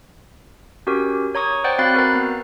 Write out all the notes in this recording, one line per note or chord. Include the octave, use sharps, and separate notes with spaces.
C#4 F#4 G4 A#4
C#5 A#5 C#6 D#6
C5 D5 F#5 G5
C4 F#4 F5 B5 F#6 A6
F#4 A#4 B4 A#5
B3